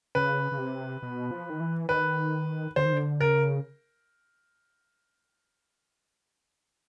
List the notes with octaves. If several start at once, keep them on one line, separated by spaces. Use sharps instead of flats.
C#3 B4
C#3
C3
B2
F3
D#3
E3
D#3 B4
D3 C5
D#3
D3
C#3 A#4